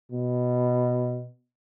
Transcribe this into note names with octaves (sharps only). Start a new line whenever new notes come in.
B2